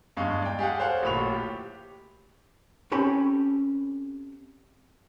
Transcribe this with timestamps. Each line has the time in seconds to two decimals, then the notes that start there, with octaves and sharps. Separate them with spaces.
0.17 E2 G2 G#3 F5 C#6
0.42 D5 G5
0.59 G4 G#4 F5 F#5
0.79 A4 C5 C#5 F5 F#5
1.02 D1 A1 A#2 B5 C#6 F7
1.33 G4
2.92 C4 C#4 G4 A4 G#5 B5